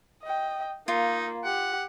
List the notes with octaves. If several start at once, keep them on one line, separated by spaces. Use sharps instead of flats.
D#5 G5
A#3 D#4 F4
G4 F#5